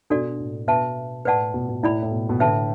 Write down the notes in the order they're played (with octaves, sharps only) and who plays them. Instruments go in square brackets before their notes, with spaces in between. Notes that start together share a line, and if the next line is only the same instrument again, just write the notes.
[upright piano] B2 [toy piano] D4 F#4 A4 D5
[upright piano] A2
[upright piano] B2 [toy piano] B4 E5 A5
[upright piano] A2 [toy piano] B4 D5 F#5 A5
[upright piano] B2
B2
[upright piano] A2 [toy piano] E4 D5 B5
[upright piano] A2
B2
B2
[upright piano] A2 D3 [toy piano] B4 E5 A5